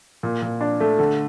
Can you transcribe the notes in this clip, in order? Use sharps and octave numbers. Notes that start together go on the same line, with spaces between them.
A#2
A#2
D4
A3
D3